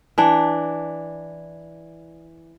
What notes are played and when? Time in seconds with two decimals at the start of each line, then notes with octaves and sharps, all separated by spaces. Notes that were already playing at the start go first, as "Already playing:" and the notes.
0.18 E3 D4